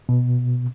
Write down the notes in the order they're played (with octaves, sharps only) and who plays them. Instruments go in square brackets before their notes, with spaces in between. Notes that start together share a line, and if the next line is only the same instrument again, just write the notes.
[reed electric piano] B2